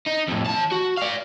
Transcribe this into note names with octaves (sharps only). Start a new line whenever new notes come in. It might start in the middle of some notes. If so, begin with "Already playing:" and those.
D#4
F2 A2
E3 A5
F#4
D5 F5